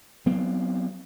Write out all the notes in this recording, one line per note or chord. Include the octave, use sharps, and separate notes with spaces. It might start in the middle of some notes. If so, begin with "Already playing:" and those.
F#3 B3 C4